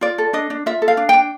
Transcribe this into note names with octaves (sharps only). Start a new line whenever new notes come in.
F4 D5
A4
D4 D#5
D4
F4 E5
A4
F5
D4
D4 G5